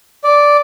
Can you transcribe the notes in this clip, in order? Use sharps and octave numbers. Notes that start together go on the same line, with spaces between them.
D5